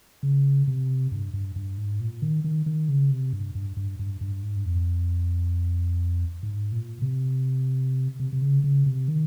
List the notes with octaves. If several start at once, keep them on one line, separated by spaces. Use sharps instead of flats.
C#3
C3
G2
G2
G2
G#2
A#2
D#3
D#3
D#3
C#3
C3
G2
G2
G2
G2
G2
G#2
G2
F2
G#2
A#2
C3
C3
C3
C#3
C#3
C3
D#3